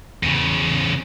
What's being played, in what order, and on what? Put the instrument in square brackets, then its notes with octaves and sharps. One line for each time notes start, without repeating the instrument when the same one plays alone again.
[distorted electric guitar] E2 C#3